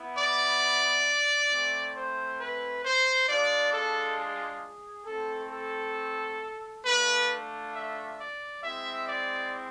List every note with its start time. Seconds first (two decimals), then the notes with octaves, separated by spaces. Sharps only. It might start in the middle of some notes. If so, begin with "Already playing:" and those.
Already playing: B3 E4
0.17 D5
1.49 A3 C4 E4
1.95 C5
2.38 B4
2.83 C5
3.28 G#3 D4 F4 D5
3.72 A4
4.17 G#4
5.06 A3 C4 E4 A4
5.50 A4
6.84 A3 D4 F4 B4
7.73 E5
8.18 D5
8.62 G#3 C4 E4 E5
9.07 D5